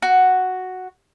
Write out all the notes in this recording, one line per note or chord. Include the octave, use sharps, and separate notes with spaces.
F#4